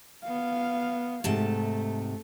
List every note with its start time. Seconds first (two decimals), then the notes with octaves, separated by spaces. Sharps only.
0.24 B3 F5
1.24 G#2 C3 A3 A5